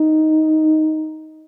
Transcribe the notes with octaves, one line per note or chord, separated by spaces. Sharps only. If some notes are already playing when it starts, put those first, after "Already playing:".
Already playing: D#4